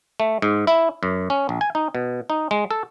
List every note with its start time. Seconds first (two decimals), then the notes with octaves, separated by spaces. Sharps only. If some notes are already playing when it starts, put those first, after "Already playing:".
0.20 A3
0.42 G#2
0.67 E4
1.03 F#2
1.30 C#4
1.49 A#1
1.61 G#5
1.75 D#4
1.95 B2
2.30 D#4
2.51 G#3
2.71 A4